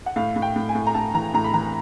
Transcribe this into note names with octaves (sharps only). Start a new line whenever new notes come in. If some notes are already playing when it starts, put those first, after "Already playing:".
F#5
A2 F5
A2
G5
A2
G#5
A2
A#5
A2 A5
E3 A#5
A2 A#5
B5
E3 A#5